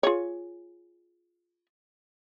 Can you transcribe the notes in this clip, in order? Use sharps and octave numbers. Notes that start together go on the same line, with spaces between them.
F4 G#4 C#5